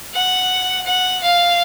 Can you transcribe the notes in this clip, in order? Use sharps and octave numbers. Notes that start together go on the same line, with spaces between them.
F#5
F#5
F5